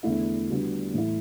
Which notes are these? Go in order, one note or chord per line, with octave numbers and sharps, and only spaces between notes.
E2 D3 A3 E4
D3 G3 B3 F#4
A2 E3 A3 E4